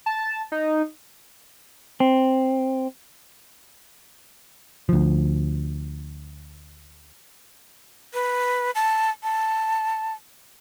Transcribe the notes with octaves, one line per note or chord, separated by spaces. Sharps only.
A5
D#4
C4
D2 F3
B4
A5
A5